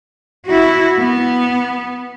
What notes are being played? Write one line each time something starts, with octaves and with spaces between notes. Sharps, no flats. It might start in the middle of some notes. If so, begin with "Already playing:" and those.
E4 F#4
B3